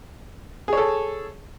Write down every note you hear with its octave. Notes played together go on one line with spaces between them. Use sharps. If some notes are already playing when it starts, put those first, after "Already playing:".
G#4 A4 C#5